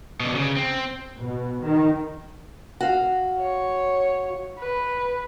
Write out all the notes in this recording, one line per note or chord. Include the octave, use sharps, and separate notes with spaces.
B2 D3
C#3
C4
B2
D#3
F#4 F5
C#5
B4